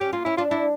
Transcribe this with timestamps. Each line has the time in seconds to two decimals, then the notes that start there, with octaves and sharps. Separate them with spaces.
0.01 C#4 G4
0.13 A#3 F4
0.25 C#4 E4
0.37 D4 F4
0.51 D4 E4